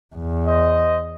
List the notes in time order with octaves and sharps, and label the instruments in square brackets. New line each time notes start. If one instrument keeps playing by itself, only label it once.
[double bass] E2
[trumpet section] C5 D#5